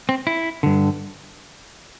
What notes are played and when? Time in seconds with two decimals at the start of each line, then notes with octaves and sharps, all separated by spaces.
0.09 C4
0.27 E4
0.63 G2 D3